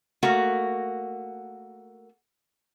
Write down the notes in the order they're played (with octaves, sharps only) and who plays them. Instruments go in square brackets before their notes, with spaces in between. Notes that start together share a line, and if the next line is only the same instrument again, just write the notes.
[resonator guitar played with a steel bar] A3 A#3 F#4